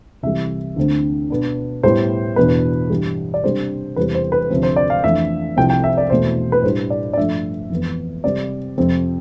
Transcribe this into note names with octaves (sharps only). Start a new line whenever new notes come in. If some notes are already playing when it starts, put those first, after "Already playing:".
C2 C3 E3 G3 E5
D2 D3 A3 C4
B2 B3 D4
A2 G3 B3 C5
E2 B2 B3 D4 B4
G2 E3 G3
D5
C3 G3 D4 C5
E2 C3 G3 C4 B4
C5
B4
D2 C3 F3 C4
C5
D5
F5
F2 E3 A3 D4 E5
C2 C3 F3 C4 G5
G5
E5
D5
E2 B2 A3 C4 C5
B4
A2 G3 D4 C5
D5
D5
G2 F3 A3 E5
F2 E3 B3
C3 G3 C4 D5
F2 C3 F3 C4